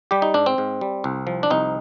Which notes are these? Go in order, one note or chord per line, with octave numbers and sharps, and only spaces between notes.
G3 G4
D#4
G#2 D4
C4
G#2
G3
C2
F3
D4
C2 D#4